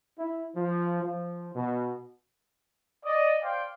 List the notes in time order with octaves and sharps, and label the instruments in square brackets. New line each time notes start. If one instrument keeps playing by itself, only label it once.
[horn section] E4
F3
F3
B2
[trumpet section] D5 D#5
C5 D5 F5 G5